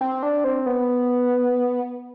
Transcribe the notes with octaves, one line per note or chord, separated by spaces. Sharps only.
C4
D4
C4
B3